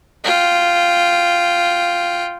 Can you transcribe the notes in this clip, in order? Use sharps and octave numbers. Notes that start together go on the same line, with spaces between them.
F4 G5